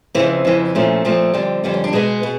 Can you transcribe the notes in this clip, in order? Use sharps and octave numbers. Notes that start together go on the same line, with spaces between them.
F2 C#3 E3 C4
F2 C#3 E3
A#2 F3 A3 C#4
A#2 F3 A3 C4
F2 D3 G3
F2 D3 G3 B3
C#4
D4
B2 G#3 B3 G#4
B2